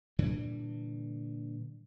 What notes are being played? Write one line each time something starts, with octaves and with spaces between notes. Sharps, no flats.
A#2 D3 E3 G3